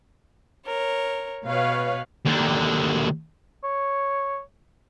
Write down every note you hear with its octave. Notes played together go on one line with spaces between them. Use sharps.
A#4 C#5
B2 B4 C#5 F5
D#2 D3
C#5